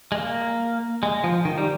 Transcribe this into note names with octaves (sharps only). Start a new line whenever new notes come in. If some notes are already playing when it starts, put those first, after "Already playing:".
G#3
A#3
G#3
F3
D#3
G3